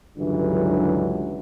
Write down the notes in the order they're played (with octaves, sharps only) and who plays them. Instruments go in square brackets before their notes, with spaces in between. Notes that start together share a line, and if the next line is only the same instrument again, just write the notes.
[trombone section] C#2 G2 D3 E3 F#3